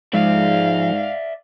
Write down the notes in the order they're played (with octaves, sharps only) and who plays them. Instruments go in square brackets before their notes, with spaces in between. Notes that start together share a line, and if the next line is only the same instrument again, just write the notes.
[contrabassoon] G#2 [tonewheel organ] F3 G#3 [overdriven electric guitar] D5 E5 [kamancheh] F5